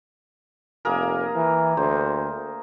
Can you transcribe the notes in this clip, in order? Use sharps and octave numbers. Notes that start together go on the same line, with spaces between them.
F1 A#3 G#4 A#4
E3
D2 C5